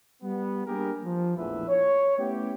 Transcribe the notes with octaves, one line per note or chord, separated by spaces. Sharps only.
G3 B3
G3 A#3 D4 G4 G#4 A#4
F3
A#1 E2 A2 E3 B4 E5
C#5
A3 B3 C#4 E4 G4